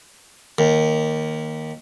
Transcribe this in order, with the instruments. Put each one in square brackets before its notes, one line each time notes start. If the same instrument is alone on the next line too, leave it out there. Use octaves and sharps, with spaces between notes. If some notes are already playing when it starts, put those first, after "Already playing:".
[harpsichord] D#2